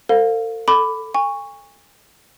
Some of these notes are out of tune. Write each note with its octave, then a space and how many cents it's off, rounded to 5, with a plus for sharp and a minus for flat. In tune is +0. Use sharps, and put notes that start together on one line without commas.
A4 +45 C5 -10 F5 +20
A4 +0 B5 +15 D6 +0
G#5 -35 C#6 +0